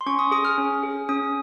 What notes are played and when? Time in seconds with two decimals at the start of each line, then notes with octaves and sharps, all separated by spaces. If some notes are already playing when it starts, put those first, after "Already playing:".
0.01 C6
0.06 C#4 C#6
0.19 D#6
0.31 G#4 D#6
0.45 F6
0.58 C#4
0.83 G#4
1.09 C#4 D#6